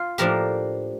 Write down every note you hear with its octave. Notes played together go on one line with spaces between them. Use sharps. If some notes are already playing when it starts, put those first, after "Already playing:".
Already playing: F4
A2 F3 A#3 D4 G4 A#4